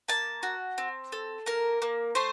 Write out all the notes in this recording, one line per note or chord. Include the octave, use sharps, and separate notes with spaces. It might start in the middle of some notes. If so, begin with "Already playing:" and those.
A#3 A5
F#4
C4
A4
A#3 A#4
A#3
A3 C5